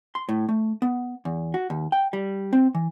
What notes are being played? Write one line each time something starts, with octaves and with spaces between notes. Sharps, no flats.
C6
A2
A3
B3
E2
F#4
D#2
G5
G3
C4
E3